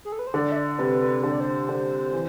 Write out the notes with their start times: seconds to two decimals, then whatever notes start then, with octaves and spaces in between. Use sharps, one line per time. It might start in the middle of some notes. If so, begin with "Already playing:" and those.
0.05 G#4
0.12 A4
0.19 B4
0.27 C5
0.34 D3 D5
0.52 E5
0.56 D5
0.78 C3 B4
1.01 B4
1.23 D3 C5
1.32 D5
1.40 C5
1.69 D3
2.13 E3